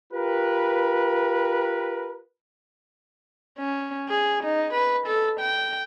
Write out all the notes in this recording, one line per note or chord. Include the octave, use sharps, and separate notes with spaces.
F4 G4 A#4 B4
C#4
G#4
D#4
B4
A4
G5